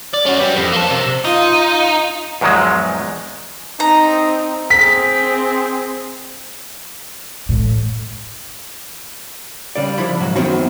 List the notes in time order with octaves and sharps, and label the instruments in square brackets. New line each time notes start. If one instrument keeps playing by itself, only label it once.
[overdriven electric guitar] D5
C#4 F#4
G4 B4
F2
A#3 A5
C3
[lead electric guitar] D#4 [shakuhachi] F4
[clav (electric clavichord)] E2 G#2 D#3 F3 F#3 G#3
[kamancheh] C4 D#4 [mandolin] A#5
[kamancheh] C4 G#4 [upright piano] B6
[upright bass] A2
[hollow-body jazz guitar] C#3 G3 D5
F3 E4 B5
B1 G#2 F#3 F#4
F#2 D#3 E3 B3 C4 F#4